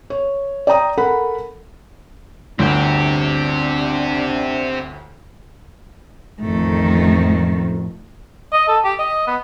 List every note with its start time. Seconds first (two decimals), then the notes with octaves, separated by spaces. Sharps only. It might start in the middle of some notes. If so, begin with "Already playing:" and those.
0.10 C#5
0.67 D5 G5 A#5 D#6
0.97 A4 A#4 F#5 B5
2.59 G1 D2 C4 D4 G4
6.41 A1 F2 D#3 A3
8.53 D#5
8.68 A4
8.84 G4
8.99 D#5
9.27 B3